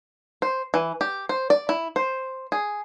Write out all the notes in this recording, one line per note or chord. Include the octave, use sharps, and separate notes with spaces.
C5
E3
G4
C5
D5
E4
C5
G#4